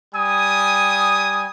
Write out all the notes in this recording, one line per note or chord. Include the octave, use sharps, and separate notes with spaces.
G3 G#5 D#6